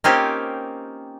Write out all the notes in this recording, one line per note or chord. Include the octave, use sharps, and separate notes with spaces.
A#3 C4 C#4 D#4 F4 G4